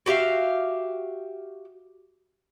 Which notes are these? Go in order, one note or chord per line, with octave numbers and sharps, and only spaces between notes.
F#4 G4 E5 F5